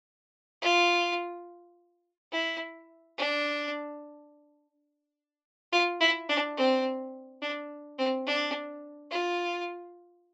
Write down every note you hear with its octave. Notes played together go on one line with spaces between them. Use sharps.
F4
E4
D4
F4
E4
D4
C4
D4
C4
D4
F4